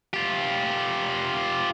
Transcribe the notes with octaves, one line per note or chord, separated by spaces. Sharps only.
F4 G4